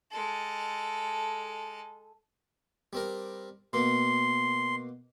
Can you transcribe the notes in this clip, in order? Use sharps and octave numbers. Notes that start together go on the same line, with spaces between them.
G#3 A4
G3 C4 A#4
B2 A#3 C6